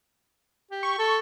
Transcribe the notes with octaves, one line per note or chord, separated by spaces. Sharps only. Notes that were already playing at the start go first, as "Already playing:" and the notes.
G4
C#6
A4